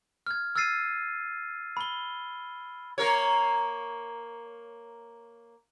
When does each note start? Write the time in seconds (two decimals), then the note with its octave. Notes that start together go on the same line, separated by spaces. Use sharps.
0.26 F6 G#6
0.55 E6 F6 G#6 A6 C7 D#7
1.77 B5 G7
2.98 A#3 A#4 C#5